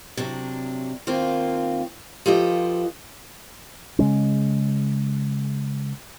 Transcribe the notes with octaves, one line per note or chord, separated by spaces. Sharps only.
C3 F#3 D4
D#3 A#3 C4 F4
F3 F4 G4 A4 B4 D#5
C#3 G#3 C#4